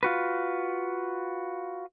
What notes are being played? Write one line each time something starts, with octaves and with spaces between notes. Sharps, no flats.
F4 F#4 B4